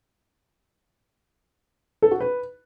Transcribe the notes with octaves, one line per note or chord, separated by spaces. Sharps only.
A4
F#4
B4